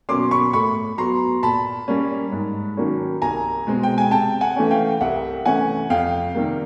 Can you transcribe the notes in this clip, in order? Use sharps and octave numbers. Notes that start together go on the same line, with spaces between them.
B2 F#3 A#3 C#4 C6 D6
B5 C#6
A2 B5 C#6
F#3 B3 A#5 C6
A#2 A5 B5
G3 A#3 C#4
G#2
D#3 F#3 A#3 C#4
C2 G#5 A#5
B2 G#3 C4
G5
G#5
C3 G5 A5
F#5 G#5
E3 A3 C#4
F5 G5
C2 E5 F#5
C3 E3 A3 C#4 F#5 G#5
F2 F5 G5
C3 D#3 G3 A#3